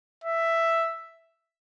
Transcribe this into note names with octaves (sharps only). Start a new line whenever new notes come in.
E5